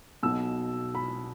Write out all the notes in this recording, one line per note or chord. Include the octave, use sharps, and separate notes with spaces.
B1 B2 E6
B5